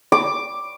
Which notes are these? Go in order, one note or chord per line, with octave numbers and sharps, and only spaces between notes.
D6